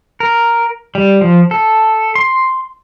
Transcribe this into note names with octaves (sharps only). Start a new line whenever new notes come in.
A#4
G3
F3
A4
C6